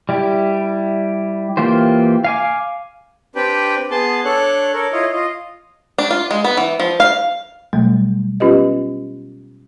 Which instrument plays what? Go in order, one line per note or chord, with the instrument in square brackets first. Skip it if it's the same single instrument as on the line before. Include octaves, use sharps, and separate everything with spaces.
[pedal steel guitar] G3 E4 G4
E3 A#3 F4 G4 C5
F5 G#5 D6
[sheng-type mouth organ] C4 D4 G4 B4 G5
B3 G#4 A5 C6
D4 A4 C#5 F#6
A4 A#4 C#5
E4 F4 C#5 D#5
F4 D#5
[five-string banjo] D4
F4
G#3
B3
E3
F3
F5
[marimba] B2 F#3 G3 A3
B3 C#4 F4 G4 B4 D#5